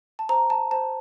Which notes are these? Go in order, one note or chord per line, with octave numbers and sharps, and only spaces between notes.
A5
C5 A#5
A5
C5 A5